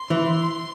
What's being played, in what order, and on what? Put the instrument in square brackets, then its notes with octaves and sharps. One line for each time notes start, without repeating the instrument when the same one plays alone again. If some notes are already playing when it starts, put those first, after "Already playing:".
Already playing: [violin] C6
[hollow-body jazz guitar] E3